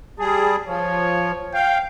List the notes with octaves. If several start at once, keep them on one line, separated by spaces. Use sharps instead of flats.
G3 G#4 A5
F3 C#5
F5 G5